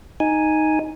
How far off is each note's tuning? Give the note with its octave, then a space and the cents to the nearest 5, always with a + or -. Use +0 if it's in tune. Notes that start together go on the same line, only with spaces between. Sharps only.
D#4 +0 G#5 +0